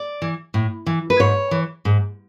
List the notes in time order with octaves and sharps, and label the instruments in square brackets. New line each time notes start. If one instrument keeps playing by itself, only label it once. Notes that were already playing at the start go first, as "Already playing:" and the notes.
Already playing: [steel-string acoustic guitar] D5
E3
A2
E3
B4
G#2 C#5
E3
G#2